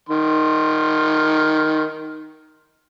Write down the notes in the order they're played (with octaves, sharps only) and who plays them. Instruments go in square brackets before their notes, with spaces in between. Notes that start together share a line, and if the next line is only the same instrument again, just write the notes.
[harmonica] D#3 C6